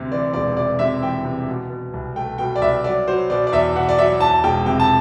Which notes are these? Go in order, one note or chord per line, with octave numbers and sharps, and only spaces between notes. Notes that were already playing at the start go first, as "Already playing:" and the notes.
Already playing: D2 C3
E3 D5
E1 D5
C3 D5
C3 E5
E3 G5
C3
B2
B2
C2
A3 G5
B2 G5
D5
C2 E5
F#3 D5
F#3 C5
B2 D5
D5
E2 E5
B2 F#5
D5
F#3 E5
E2 A5
E1 G5
C3 G5
A5